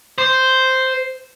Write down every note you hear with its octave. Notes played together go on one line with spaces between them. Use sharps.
C5